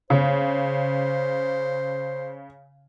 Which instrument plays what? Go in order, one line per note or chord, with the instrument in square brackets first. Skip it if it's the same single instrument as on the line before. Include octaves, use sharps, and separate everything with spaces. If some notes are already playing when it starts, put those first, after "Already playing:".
[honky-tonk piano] C#3 [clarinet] C5